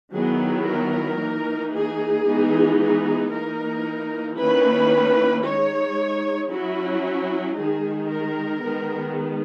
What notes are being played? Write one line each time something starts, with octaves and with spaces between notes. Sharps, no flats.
D#3 F#3 B3 E4 G#4
A#4
E3 A#3 D#4
G#4
E3 G#3 B3 D#4
G#4
E3 A#3 D#4 A#4
D#3 A#3 C#4 E4 B4
G#3 D#4 C#5
F#3 C#4 E4 F#4
D#3 G#3 D#4 G#4
A#4
D#3 G#3 B3